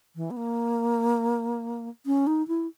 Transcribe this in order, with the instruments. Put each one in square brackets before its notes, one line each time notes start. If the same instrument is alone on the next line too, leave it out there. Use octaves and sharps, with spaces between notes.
[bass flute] E3
B3
A#3
C#4
D#4
E4